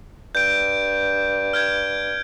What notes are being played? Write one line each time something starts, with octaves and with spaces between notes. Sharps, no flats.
G2 G6 D7
F6 G6 G#6